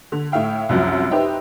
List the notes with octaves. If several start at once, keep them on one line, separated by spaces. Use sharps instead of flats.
D3
A2 E5 F5 G5
C2 F#2 F3 F#3
D#4 E4 G4 B4 C5